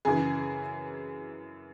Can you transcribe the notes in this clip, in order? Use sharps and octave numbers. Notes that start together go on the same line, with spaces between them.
F#2 C#3 E3 G#4